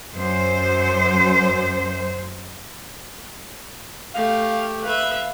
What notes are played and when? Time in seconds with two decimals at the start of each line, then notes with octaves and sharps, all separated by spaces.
0.14 F#2 C5
4.15 A3 G4 F5
4.84 B4 E5 F5